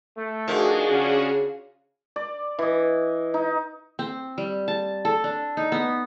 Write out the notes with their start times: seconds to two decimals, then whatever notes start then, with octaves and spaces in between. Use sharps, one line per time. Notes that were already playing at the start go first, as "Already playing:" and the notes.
0.17 A3
0.48 D#3 F3 D4 F#4 G#4
0.90 C#3 C#4
2.16 D5
2.59 E3 D#5
3.34 D#4
3.99 C4
4.38 G3
4.68 A5
5.05 A4
5.24 D4
5.57 D#4
5.72 B3